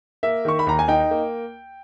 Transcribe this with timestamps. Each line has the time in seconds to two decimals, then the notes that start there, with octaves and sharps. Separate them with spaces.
0.23 A#3 E5
0.45 D#3 C#6
0.59 B5
0.66 D#2 A#5
0.79 G#5
0.88 D#4 G5
1.11 A#3